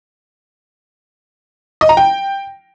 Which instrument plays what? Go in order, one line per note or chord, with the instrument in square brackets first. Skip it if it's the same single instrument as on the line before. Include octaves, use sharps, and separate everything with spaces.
[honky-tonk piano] D#5
A#5
G5